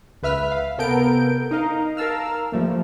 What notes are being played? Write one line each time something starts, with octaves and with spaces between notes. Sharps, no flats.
C#2 B4 E5 F6 B6
F5
C3 B3 A4 A#4 G6 D7
D#4 A#4 D#5 F5
A#4 F5 A5 E6 F6
F3 G3 A3 A#3